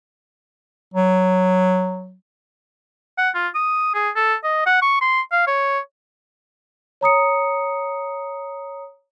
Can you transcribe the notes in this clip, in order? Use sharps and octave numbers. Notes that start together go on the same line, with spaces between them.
F#3
F#5
F4
D#6
G#4
A4
D#5
F#5
C#6
C6
F5
C#5
C#5 A#5 D#6 C#7